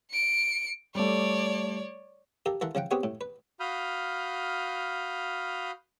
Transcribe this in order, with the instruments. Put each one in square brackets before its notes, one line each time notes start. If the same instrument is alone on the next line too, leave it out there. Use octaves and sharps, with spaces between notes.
[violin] C#7 D7
[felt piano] G3 A3 [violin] C#5 D5
[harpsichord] G4 A4 A#4 F5
E3 A4 A#4 F5 F#5 C6
C#3 F3 F#5 G5
B3 C4 G4 G#4 C#5 F#5
A2
B4
[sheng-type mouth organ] F#4 F5 B5 D#6 F6 G6